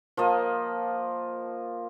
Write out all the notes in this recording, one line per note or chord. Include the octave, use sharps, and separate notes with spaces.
F3 A#3 D#5